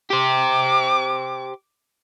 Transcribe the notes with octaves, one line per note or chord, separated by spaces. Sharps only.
G4 C5 D6